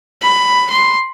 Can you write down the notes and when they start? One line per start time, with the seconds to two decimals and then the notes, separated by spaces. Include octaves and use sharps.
0.22 B5
0.70 C6